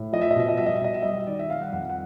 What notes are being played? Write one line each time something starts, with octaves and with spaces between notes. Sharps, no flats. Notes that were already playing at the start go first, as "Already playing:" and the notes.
Already playing: A2
F3 D#5
E5
D#5
B2 E5
D#5
G3 E5
D#5
E5
B2 D#5
E5
G3 D#5
D#3 D5
E5
G3 F5
F#5
F2 F#5
F#5